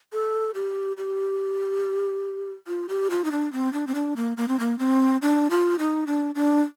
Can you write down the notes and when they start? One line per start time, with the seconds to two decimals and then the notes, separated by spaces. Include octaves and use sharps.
0.13 A4
0.55 G4
0.97 G4
2.67 F4
2.89 G4
3.10 F4
3.24 D#4
3.32 D4
3.53 C4
3.73 D4
3.87 C4
3.95 D4
4.16 A#3
4.37 A#3
4.48 C4
4.60 A#3
4.79 C4
5.22 D4
5.50 F4
5.79 D#4
6.07 D4
6.35 D4